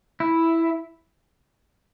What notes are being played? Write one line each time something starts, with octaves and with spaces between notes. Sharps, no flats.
E4